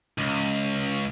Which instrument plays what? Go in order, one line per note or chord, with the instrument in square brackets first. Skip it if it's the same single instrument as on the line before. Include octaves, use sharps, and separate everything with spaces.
[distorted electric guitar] C#2